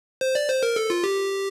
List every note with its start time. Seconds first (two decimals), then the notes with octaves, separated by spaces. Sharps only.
0.21 C5
0.35 D5
0.49 C5
0.63 A#4
0.76 A4
0.90 F4
1.04 G4